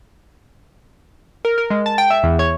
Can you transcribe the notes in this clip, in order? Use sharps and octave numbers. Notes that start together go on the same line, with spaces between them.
A#4
A#4
G#3
A5
G5
E5
E2
C#5